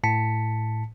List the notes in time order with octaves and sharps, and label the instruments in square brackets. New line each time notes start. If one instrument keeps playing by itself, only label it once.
[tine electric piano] A2 A5 B6 C#7